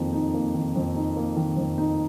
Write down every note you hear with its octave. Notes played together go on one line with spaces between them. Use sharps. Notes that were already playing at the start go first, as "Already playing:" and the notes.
Already playing: F2 D#3 A#3 D#4
D#4
A#3
D#3
F2
D#4
A#3
D#3
F2
D#4